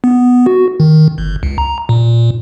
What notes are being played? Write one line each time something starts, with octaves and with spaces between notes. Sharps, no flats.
B3
F#4
D#3
G1
C#2
A#5
A#2